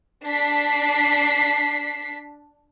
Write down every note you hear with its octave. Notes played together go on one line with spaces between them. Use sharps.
D4 B6 C7